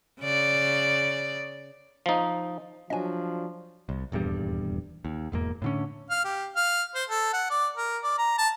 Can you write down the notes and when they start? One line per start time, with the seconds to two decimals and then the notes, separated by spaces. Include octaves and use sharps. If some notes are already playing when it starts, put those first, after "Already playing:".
0.20 C#3 D5
2.06 F3 D#4
2.90 F3 F#3 D4 D#5 G#5
3.89 C2
4.12 D#1 E2 G2 G3
5.05 D#2
5.32 E1 E2 G#2 A#3
5.62 A2 D3 C#4
6.10 F5
6.24 G4
6.56 F5
6.95 C5
7.09 A4
7.33 F#5
7.50 D5
7.77 A#4
8.03 D5
8.18 A#5
8.38 A5